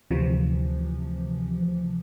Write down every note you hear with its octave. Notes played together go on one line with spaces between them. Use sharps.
D2 C3 E3 F3